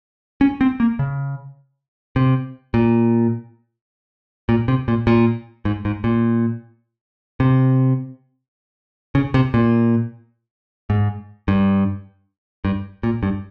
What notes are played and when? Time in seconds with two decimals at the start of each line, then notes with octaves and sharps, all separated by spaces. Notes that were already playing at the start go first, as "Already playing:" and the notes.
0.41 C#4
0.61 C4
0.80 A#3
0.99 C#3
2.16 C3
2.74 A#2
4.49 A#2
4.68 C3
4.88 A#2
5.07 A#2
5.65 G#2
5.85 G#2
6.04 A#2
7.40 C3
9.15 C#3
9.34 C3
9.54 A#2
10.90 G#2
11.48 G2
12.65 G2
13.03 A#2
13.23 G2